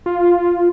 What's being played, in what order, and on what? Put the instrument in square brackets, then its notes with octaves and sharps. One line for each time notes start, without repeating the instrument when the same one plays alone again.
[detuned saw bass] F4